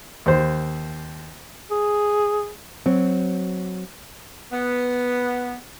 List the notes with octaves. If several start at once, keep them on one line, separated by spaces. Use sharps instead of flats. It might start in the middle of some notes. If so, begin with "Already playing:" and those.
D#2 C5
G#4
F#3 C4
B3